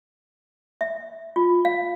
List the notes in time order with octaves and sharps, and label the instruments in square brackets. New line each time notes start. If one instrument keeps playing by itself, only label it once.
[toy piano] E5
F4
F5